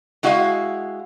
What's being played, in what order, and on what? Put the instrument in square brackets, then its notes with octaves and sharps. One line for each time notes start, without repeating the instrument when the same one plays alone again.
[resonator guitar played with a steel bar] G#3 E4 F#4 G4 D#5 F5